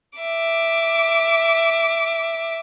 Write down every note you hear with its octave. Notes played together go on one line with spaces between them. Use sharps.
E5 D6